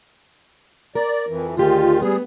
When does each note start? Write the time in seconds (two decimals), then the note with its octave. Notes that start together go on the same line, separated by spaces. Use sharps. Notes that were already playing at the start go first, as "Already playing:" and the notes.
0.95 A#4 D5
1.29 F2 E3
1.57 D2 D#3 F4 G4 G#4
2.02 G3 B3 G#4